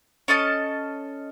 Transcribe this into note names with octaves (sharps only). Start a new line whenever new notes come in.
C#4 A4 D#5 A5